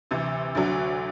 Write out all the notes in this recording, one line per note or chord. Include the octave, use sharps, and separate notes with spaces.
D2 C3 E3
D2 D3 F#3